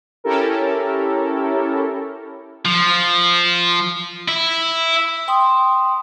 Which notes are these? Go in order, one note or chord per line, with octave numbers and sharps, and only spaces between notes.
C#4 E4 G4 A4 A#4
F3
E4
G5 C6 D#6